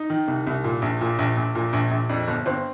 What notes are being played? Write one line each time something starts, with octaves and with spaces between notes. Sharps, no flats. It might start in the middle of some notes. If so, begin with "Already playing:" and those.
Already playing: D#4
D#3
C2
C2
A#2
A#1
A#2
A#1
A#1
A#2
A#1
A#1
F2 D4
G1
G1 C4